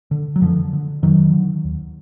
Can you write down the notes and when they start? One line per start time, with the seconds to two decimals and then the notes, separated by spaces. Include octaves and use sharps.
0.11 D3
0.36 F#3
0.41 F2 D3 F3
0.73 D3
1.02 F2 D#3 F#3
1.33 D3
1.64 D#2